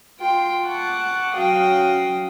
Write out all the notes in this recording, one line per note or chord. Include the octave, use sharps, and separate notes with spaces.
F4 G5 C6
F#5 A5 C#6 D6
F#3 C#4 F#4 F5 G5 D#6